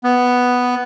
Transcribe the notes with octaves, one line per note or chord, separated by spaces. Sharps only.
B3